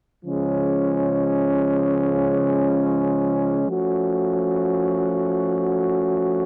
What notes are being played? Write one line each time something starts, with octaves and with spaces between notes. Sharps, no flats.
C#3 F3 G#3 C#4
F3 A3 C#4 F#4